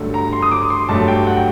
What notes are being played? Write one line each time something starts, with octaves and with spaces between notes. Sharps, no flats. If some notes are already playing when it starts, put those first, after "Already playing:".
Already playing: G2 D3 F#3 A3
A#5
C6
D#6
D6
C6
G2 F#3 A3 A5
G5
F#5
G5